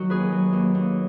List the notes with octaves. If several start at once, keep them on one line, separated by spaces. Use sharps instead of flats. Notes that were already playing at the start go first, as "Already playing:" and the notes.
Already playing: D#3 F#3 F#4
D#2 G#4 B4
F#3
D#2
D#2